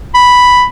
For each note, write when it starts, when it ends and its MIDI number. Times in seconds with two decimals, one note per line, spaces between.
0.14 0.64 83